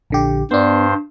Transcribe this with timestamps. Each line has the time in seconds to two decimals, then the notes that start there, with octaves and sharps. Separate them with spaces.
0.10 A#1 D3 G4
0.51 G2 B3 D4 C5